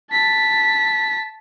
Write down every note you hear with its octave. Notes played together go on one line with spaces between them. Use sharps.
A5 B6